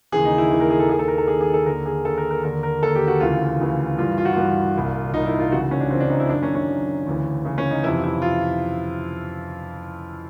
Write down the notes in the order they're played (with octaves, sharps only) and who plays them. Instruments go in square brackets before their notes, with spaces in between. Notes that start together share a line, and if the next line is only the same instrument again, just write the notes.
[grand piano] D#2 C#3 E3 G#4
D#4
E4
D#2 C#3 E3
A#4
G#4
A4
D#2 D#3 G#4
A4
A#4
A4
D#2 D#3 G#4
G#4
A4
D#2 D3 A#4
G#4
D#2 D3 A4
A#4
A#4
D#2 D3 A#4
A#4
D#2 D3 A4
G4
F#4
D2 C#3 E3 F4
D2 C#3 E3
G2 E3 F4
F4
F#4
G2 E3 F4
C2 A#2
C2 A#2 D#4
E4
F4
C#2 C#3 E3 F#4
C#4
D4
C#2 C#3 E3 C4
D4
D#4
E4
F#2 D4
D#3
C#4
C#4
F#2 D#3
D2 C#3 E3
D2 C#3 E3
C#4
D#4
F2 C3 E3 E4
E4
F4